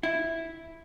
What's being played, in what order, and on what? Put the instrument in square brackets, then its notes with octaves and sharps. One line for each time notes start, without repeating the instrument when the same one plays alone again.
[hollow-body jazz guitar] E4